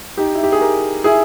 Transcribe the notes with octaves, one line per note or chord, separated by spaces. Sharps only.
D#4 G4
E4
G4
G#4
G4 A#4
E4 G#4